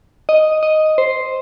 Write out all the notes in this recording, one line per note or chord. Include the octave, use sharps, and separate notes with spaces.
D#5
D#5
C5